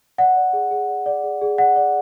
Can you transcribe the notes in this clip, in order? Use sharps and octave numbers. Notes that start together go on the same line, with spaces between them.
D5 F#5
D5
G#4
G#4
D5
D5
G#4
G#4
D5 F#5
D5